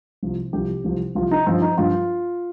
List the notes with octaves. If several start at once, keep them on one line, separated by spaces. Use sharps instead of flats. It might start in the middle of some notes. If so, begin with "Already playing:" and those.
C2 C3 F3
C2 C3 F3 G4
C2 C3 F3
C2 C3 F3 F4
D#4
G2 F3 C4
D#4
G2 F3 F4